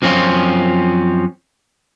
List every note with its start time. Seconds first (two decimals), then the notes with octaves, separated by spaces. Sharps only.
0.02 F#2 F3 C4 C#4 F4